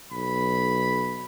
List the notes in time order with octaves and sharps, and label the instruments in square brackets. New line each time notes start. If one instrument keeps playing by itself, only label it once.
[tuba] B1 [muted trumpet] B5